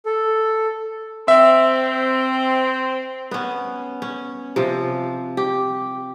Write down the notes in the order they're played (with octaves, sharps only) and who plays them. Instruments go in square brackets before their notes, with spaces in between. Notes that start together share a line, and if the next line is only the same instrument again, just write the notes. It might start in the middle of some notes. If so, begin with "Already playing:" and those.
[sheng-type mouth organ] A4
[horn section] C4 [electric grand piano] E5
[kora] B3 C#4
C#4
C3 F3
G4